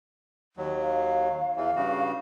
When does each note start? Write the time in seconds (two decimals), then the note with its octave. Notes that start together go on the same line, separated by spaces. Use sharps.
0.57 D#2 F#3
0.82 F5
1.57 E2 E3 F5
1.76 G2 C#3 F#4